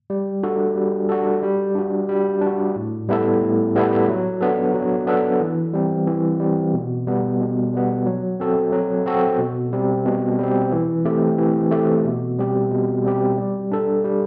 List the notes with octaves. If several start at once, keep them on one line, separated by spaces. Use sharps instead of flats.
G3
D4 F#4 A4
G3
D4 F#4 A4
G3
D4 F#4
G3
D4
F#4
A2
G3 B3 E4 A4
A2
G3 B3 E4 A4
F#3
B3 D4 A4
F#3
B3 D4 A4
E3
G3 C4
E3
G3 C4
B2
G3 B3
B2
G3 B3
F#3
C4 F#4 A4
F#3
C4 F#4 A4
B2
G3 C4
B2
G3 C4
E3
A3 C4 G4
E3
A3 C4 G4
B2
G3 C4 G4
B2
G3 C4 G4
G3
D4 A4
G3